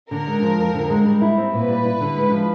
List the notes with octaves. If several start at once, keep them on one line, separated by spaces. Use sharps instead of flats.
D3 A#4
G#3
F3
F2
D3
G#3
G3
E4
C4
A#2 B4
G3
E4
D3
G#3
F3